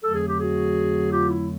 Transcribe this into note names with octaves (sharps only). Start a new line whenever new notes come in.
F2 D3 F#3 A3 A4
G#4
G4
F#4 G#4
F4 G4
E4